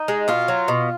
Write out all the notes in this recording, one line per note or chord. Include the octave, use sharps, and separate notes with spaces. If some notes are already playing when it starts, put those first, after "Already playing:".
Already playing: D#4
G#3
B2 F4
F#3
B2